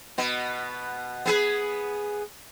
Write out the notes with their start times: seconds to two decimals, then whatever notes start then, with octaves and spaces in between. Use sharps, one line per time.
0.18 B2 B3
1.26 B3 G#4 B4